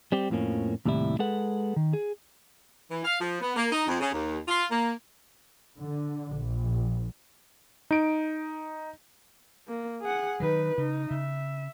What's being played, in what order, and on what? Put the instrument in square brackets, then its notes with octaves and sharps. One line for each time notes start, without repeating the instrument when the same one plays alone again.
[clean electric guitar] G3 C4 G4
F2 A2 F3 A#3 C#4
D#2 A2 C3 G3 E4
G#3 G#4 A4 B4 F#5
D#3
G#4
[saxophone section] E3
F5
F3
B3
A#3
D#4
F2
C#3
D#2
F4
A#3
[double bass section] D3
A#1
[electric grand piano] D#4 D7
[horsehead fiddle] A#3
G#4 F#5
[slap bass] D#3 F#3 [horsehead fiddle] D#4 B4
[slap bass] C#3 [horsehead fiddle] D#4
[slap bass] C#3 [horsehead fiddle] E5